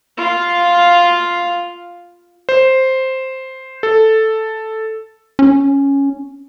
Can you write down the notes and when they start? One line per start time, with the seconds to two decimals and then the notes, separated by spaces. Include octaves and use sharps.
0.17 F4 F5
2.49 C5
3.83 A4
5.39 C#4